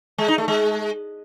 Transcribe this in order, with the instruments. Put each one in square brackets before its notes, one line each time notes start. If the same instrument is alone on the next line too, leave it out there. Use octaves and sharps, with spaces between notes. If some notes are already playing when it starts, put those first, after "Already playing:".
[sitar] G#3
D#4
A3
G#3